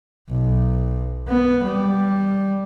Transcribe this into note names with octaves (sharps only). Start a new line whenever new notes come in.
B1
B3
G3